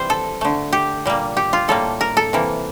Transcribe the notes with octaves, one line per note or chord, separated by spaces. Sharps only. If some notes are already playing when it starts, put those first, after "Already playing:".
Already playing: C3 E3 G3 C5
A4
D3 A3
G4
A#2 G3 A#3
G4
F4
A2 G3 A#3 A4
A#4
A4
C3 E3 A#3